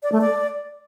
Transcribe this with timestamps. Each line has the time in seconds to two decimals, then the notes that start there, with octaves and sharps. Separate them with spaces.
0.03 D5
0.12 A3
0.21 D5